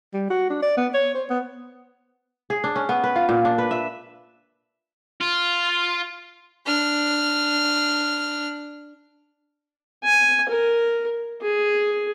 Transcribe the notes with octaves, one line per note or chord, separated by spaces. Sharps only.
G3
F#4
D4
D5
B3
C#5
C5
B3
G#4
D4
C#4
B3
B4
F4
A#2
D4
B4
E5
F4
D4 F6
G#5
A#4
G#4